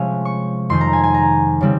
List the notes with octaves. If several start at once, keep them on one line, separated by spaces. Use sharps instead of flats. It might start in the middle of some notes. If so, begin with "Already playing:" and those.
Already playing: C3 F3 G#3 C#4
C#6
F2 D#3 G#3 C6
A#5
G#5
G#5
A#5
C#3 G3 C4